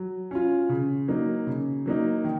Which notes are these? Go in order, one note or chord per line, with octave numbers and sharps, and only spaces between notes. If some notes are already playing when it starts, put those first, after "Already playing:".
Already playing: F#3
C#4 F4
C#3
F#3 A#3 D#4
C#3
F#3 A#3 D#4
D#3